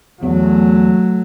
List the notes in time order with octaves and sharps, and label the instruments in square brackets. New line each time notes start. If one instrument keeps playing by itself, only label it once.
[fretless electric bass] E2 [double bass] F#3 A3